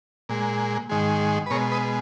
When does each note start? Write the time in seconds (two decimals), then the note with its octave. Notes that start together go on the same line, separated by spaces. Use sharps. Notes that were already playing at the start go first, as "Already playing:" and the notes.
0.29 A#2 G#3
0.89 G#2 D#3 G#3
1.46 B4
1.50 B2 G#3 A#4 C#5
1.72 B4 D#5